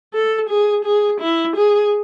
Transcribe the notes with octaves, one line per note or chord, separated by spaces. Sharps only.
A4
G#4
G#4
E4
G#4